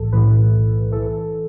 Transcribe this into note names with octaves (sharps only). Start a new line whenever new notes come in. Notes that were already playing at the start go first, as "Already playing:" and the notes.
Already playing: B1 A2 E3 A4
B1 A2 E3 B4
E3 A4